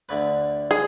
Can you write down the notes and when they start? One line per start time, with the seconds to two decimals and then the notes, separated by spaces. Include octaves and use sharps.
0.09 D2 D3 B4
0.71 G#4